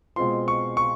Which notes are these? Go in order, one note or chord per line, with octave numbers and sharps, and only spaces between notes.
B2 G#3 C4 F4 C6
C#6
C#6